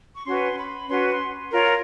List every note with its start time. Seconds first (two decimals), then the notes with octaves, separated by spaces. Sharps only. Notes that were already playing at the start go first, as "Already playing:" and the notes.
0.14 C#6
0.25 C#4 F#4 B4 C6
0.57 B5
0.88 C#4 F#4 B4 C6
1.09 C6
1.52 F4 A#4 C#5